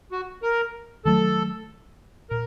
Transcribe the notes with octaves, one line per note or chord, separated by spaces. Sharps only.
F#4
A#4
D#3 F#3 A3 A4
A#2 A#4